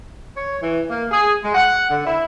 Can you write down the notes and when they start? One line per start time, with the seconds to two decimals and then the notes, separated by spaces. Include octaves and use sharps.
0.36 C#5
0.61 E3
0.88 A#3
1.11 G#4
1.43 G#3
1.55 F#5
1.89 D3
2.04 E4